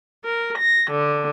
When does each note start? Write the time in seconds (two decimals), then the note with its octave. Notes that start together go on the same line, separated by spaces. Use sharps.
0.24 A#4
0.58 A#6
0.91 D3